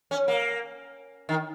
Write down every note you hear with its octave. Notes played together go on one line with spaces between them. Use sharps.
C#4
A#3
D#3